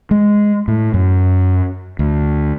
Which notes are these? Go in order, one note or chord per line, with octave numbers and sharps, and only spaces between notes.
G#3
A2
F#2
D2